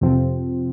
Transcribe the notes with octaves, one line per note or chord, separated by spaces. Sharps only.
F2 C3 F3 C4 F4